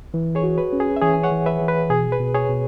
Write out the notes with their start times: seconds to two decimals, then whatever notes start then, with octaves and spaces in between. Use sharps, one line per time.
0.14 E3
0.35 G#4 C#5
0.43 F#4
0.58 B4
0.73 C#4
0.80 G#4
0.96 E5
1.02 E3 G#4 C#5
1.14 G#5
1.23 C#5 F#5
1.31 E3
1.46 B4 E5
1.61 E3
1.68 B4
1.90 B2 G#4
2.12 B4
2.20 B2
2.34 G#4 C#5
2.49 B2